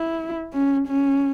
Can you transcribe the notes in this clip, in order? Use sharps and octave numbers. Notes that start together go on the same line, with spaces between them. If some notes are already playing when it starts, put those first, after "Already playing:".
Already playing: E4
C#4
C#4